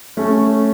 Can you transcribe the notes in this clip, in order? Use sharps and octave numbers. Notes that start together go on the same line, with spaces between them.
A3 C#4